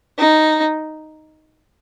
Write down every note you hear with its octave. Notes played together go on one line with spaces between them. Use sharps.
D#4